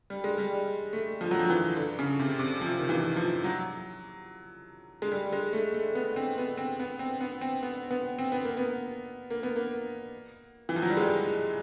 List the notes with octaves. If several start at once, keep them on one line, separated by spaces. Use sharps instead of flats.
G3
G#3
G3
A3
F3
F#3
F3
E3
D3
C#3
C3
C3
F3
D#3
E3
F3
F#3
G#3
G3
G#3
A3
A3
B3
C4
B3
C4
B3
C4
B3
C4
B3
B3
C4
B3
A#3
B3
A#3
B3
A#3
E3
F3
F#3
G3
G#3